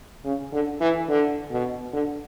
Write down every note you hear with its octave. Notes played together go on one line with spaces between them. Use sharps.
C#3
D3
E3
D3
B2
D3